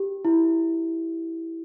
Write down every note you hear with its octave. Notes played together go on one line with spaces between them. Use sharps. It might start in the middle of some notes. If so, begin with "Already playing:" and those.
Already playing: G4
E4